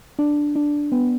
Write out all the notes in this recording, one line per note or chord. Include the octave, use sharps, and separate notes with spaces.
D4
D4
B3